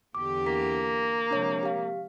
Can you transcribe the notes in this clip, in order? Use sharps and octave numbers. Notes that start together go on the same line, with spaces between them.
E2 D3 G4 D6
A#3 B6
C3 F3 G#3 D4 C#5
G4 F5